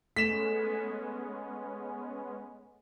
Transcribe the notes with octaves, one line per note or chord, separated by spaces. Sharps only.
G#3 A3 B3 C#4 B6 E7